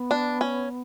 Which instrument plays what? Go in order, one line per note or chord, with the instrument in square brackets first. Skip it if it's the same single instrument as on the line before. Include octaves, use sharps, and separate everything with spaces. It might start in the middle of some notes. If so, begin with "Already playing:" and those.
Already playing: [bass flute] B3
[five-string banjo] D4
C#4